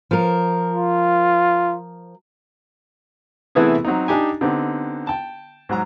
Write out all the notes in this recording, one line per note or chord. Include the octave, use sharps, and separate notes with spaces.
F3 A#4
F4
C3 E3 A3 B3 E4 G#4
F#3 C4 D#4
D4 D#4 G4 G#5
D3 B3 C4 D#4 G4
G5 A5
G#2 F#3 A#5